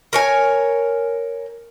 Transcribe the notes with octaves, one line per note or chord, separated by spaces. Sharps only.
A#4 C#5 G#5